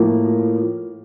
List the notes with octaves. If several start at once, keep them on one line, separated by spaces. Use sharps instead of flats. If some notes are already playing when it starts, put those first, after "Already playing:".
Already playing: A2 F3 A#3